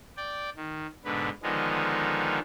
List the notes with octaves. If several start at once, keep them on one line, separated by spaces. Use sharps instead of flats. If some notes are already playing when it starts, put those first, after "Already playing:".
D5 G5
D#3
G#2 B2 D3 B4
D3 D#3 F3 G#3 B3 D#4